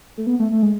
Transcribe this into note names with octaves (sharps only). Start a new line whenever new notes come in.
A3
B3
A3
A3
G#3